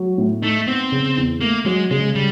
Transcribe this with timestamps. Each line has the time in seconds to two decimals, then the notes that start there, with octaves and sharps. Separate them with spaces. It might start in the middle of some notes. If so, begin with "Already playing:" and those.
Already playing: F#3
0.18 A2
0.42 A3 D#4
0.67 B3 C4
0.92 C#3
1.17 E2
1.41 A3 A#3
1.65 F#3 G#3
1.91 C#3 G#3
2.15 G3